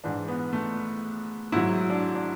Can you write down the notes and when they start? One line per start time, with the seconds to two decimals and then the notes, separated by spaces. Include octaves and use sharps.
0.04 G#2 E3 D4
0.28 B3
0.53 A3
1.52 G#2 F#3 E4
1.90 D4
2.15 D4